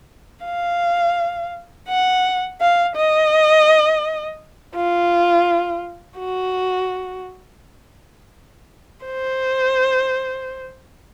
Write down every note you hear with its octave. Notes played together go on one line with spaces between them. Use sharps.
F5
F#5
F5
D#5
F4
F#4
C5